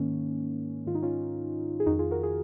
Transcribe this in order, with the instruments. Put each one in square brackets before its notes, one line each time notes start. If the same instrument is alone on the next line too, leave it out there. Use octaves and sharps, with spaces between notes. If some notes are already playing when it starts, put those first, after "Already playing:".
Already playing: [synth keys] G#2 D#3 A#3 C#4
G#2 D#3 F4
D#4
C#4 F4
G#4
F2 D#3 D#4 F#4
F4 G#4
F#4 A#4
F4 G#4